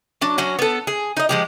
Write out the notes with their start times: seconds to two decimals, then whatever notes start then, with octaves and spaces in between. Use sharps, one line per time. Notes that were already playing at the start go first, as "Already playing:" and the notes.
0.21 F#3 D4
0.38 F#3 C#4 F#4
0.59 B3 A4
0.87 G#4
1.17 D#4 D#5
1.29 F3 G#3 G4